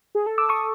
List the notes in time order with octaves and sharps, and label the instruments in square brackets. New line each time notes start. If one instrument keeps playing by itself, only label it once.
[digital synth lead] G#4
A4
[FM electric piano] D6 E6
C#6 D#6